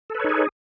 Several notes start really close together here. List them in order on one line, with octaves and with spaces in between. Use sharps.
A4 B4 C#5 D#4 G#4